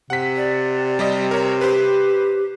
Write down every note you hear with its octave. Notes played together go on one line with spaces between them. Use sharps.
C3 F#5 B6
D5
G3 G4 D#5
A#4 C#5
G4 B4 C5